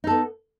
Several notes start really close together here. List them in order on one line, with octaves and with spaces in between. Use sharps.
D#4 A4 B3